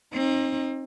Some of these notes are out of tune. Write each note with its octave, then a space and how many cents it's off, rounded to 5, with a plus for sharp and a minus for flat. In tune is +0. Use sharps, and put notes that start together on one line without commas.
C4 +35 D#4 +0